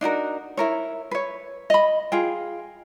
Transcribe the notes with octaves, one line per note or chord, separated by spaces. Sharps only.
D4 D#4 F#4 A#4
E4 A#4 C#5
B4 C#5
D#5 B5
F4 G#4 G5